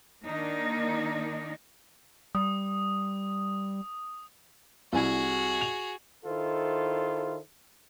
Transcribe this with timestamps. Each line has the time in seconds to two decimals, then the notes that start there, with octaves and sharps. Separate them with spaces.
0.24 D#3 A#3 D4 D#4
2.35 G3 D#6
4.93 C2 E4 F#4 G#4 G#5
5.61 F7
6.26 D#3 E4 F4 A4 C5